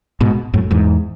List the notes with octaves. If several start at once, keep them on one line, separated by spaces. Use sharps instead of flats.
G#2 B2
F#2 A2
E2 G#2